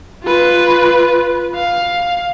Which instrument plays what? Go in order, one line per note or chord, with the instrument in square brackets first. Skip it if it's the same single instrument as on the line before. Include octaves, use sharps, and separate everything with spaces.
[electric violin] F4 B4
F5